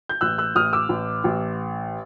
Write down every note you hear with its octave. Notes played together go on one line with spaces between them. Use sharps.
G6
A1 E6 F#6
E6 F#6
A1 D#6 F6
D6 E6
A1
A1